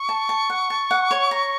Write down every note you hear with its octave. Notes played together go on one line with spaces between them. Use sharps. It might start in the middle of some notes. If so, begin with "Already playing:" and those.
Already playing: C#6
A5
A5
F#5
A5
F#5
C#5
A#5